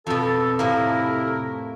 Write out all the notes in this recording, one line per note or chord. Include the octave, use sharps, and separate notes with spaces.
F2 B2 A4
A2 C3 A#3 E4 A#4